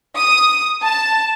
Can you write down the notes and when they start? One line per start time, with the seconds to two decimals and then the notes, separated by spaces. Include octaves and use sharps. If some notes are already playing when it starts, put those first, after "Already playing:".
0.16 D#6
0.84 A5